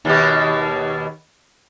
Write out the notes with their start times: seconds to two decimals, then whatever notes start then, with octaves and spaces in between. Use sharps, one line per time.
0.05 D#2 B2 G4